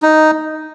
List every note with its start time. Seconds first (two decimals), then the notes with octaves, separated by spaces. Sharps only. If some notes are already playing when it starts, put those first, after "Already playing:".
0.02 D#4